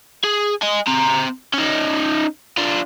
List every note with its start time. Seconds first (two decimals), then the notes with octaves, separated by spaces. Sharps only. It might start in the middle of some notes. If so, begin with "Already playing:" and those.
0.24 G#4
0.62 D#5 G#5
0.87 C4 A#5
1.54 C#4 D#4
2.57 D4 F4